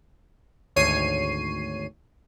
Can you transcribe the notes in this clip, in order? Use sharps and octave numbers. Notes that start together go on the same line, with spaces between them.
G#1 D2 C#5 C7 D#7